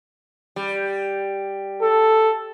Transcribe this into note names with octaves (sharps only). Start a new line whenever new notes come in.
G3
A4